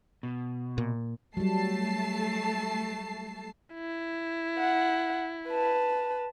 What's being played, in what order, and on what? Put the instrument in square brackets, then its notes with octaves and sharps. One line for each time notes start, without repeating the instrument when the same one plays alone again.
[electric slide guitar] B2
[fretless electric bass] A#2
[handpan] F#3 G3 [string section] A3 A5 C7
[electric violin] E4
[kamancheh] F#5
B4 A5